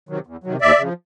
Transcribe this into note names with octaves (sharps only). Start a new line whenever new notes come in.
C3 D#3 F#3
E2
C3 D#3 F#3
D#2 D5 E5
C#3 F3